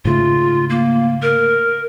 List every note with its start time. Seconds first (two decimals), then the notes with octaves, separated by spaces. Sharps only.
0.05 G#2 C#3 A3 F4
0.70 A#3
1.22 A#4